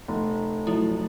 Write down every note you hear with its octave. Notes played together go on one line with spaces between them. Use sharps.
F1
F3 F#3 A3 E4